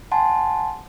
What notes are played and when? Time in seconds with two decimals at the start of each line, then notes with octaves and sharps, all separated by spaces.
0.11 F#5 G#5 A5 C6